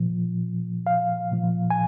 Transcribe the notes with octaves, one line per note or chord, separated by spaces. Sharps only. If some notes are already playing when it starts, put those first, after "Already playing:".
Already playing: A#2 F3
F5
A#2 F3
G#5